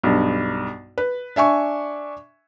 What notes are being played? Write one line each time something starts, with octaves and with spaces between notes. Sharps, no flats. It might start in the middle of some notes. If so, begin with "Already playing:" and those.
B1 G2
B4
D4 E5 G#5 C#6